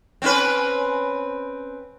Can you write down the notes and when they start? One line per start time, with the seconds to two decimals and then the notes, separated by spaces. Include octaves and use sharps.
0.22 C4 C#4 B4